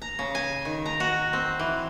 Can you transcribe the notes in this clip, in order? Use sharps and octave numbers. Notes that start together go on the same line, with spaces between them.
A#5
C#3
G#5
D#3
A#5
F#4
C4
E3